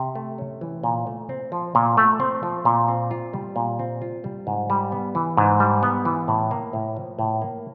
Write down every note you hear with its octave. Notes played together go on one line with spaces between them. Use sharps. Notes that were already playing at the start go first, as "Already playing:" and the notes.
Already playing: C3
A3
C#4
E3
A#2
A3
C4
F3
A#2
A3
C4
F3
A#2
C4
F4
G3
A#2
C4
F4
G3
G#2
G3
B3
E3
G#2
G3
B3
E3
A2
A#3
A2
F3
A2
A#3